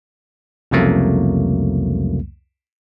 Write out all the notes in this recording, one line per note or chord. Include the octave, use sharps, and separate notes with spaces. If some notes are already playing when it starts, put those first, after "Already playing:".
C2 F2 C#3 F#3 A3 A#3